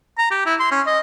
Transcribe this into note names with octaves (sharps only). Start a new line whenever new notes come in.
A#5
G4
E4
C6
C#4
D#5